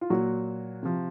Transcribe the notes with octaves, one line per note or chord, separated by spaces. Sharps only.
F4
A#2 F#3 F#4
C3 F3